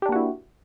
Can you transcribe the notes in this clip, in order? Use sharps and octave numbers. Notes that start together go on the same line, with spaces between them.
A#3 D4 E4 F#4 G4